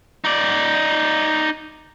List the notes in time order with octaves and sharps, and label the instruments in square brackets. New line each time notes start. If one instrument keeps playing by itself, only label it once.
[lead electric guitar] D#4 D5